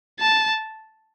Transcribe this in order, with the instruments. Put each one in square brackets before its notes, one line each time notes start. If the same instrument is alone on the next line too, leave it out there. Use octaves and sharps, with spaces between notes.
[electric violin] A5